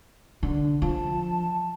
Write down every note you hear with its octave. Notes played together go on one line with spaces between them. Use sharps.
D3
F3 A5